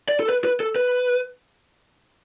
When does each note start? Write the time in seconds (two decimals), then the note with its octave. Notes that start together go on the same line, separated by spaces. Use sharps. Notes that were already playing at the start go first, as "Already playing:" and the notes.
0.09 D5
0.20 A4
0.29 B4
0.44 B4
0.60 A4
0.76 B4